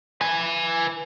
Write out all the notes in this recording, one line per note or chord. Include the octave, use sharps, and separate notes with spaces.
B4 G#5